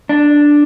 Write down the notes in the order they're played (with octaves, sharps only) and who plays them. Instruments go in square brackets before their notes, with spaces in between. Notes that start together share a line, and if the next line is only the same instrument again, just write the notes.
[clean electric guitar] D4